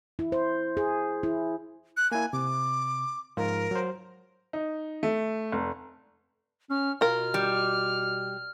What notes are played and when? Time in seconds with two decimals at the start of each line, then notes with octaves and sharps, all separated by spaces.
0.19 E4
0.32 C5
0.77 G#4
1.23 E4
1.97 F#6
2.12 A#3 E4 G#5
2.33 C3 D6
3.37 G#2 F3 F4 A#4
3.71 F#3 C5
4.53 D#4
5.03 A3
5.52 F1
6.70 C#4 F6
7.01 B2 F4 A#4 F6
7.34 G3